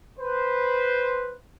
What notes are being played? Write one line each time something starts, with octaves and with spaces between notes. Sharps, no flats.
B4 C5